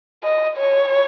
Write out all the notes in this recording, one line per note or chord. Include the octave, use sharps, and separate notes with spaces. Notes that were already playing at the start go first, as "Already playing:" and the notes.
D#5
C#5